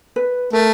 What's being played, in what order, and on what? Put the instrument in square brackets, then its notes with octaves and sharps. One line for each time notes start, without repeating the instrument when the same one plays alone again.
[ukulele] B4
[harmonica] A3 [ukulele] A#4